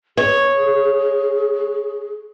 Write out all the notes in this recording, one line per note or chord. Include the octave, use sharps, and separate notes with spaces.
G#4 C#5